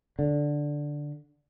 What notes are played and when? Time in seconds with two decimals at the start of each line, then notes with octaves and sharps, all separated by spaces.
0.19 D3